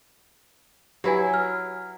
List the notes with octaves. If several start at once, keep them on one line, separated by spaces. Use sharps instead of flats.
F#3 E4 G4 B4 G#5
F6